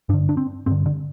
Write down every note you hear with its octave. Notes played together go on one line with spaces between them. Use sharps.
G2 D3 D4
D4
C4
G2 D3 C4
D3